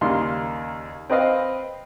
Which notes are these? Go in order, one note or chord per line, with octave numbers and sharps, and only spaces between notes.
D#2 C#3 G3 A#3 C6
C4 B4 D#5 F5